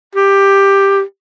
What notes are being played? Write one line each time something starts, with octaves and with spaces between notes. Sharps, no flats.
G4